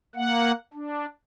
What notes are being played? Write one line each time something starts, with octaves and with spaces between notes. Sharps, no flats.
A#3 F#5
D4